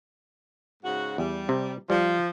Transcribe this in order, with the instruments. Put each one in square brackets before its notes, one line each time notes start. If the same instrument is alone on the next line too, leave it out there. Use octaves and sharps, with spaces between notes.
[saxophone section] G#2 C#3 F#4
[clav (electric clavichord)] E2 [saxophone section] G3
[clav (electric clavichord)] C3
[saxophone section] F3 [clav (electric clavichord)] G3